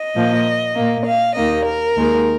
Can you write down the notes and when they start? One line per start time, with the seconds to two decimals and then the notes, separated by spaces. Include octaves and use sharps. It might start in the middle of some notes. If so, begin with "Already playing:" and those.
Already playing: D#5
0.15 A#2 F3 A#3
0.76 A#2 A#3
1.06 F5
1.36 D#2 D#3 A#3 D#5
1.66 A#4
1.97 D#2 D#3 G#3